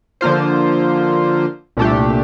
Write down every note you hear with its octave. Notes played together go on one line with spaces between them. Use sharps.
D3 F3 A#3 F4 C5
C2 A#2 A3 D4 G4